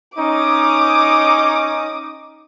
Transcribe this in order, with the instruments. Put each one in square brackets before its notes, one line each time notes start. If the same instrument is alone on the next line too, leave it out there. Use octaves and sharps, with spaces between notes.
[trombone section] C#4 D#4 [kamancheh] D6 D#6